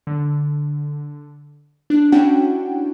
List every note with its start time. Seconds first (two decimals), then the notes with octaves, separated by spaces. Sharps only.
0.07 D3
1.90 D4 F#6
2.12 C#4 D4 E4 F#4 F#5 G5